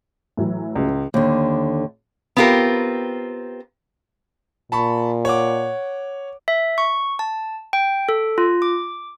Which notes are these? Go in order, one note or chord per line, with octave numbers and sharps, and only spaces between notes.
A2 E3 F#3
C#2
D#2 D3
B3 C4 F4 G4 A#4
A#2 A5 B5 C#6
C#5 F#5 D6
E5
C#6
A5
G5
A4
F4
D6